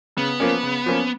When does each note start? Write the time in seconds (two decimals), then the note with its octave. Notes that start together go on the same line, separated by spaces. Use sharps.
0.17 C#3 B3
0.40 F3 A#3 C#4
0.63 C#3
0.86 F3 A#3 C#4